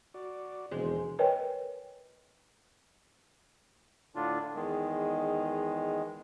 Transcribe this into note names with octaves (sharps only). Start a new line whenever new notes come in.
F#4 D5
E1 D#2 G#3 C4 C5
A#4 B4 C#5 D#5 G5 G#5
A2 D3 D4 F4
E2 D#3 G#3